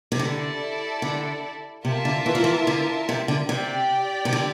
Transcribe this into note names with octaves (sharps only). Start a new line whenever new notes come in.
C3
D3 E4 A4 D5
D3
C3 F4 A#4 E5 A5
D3
E3
F3
E3
D3
C3
D3
C3 G4 D5 G5
C3
D3